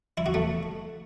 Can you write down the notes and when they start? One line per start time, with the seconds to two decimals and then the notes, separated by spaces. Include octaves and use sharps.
0.17 E4
0.26 F#4
0.34 A3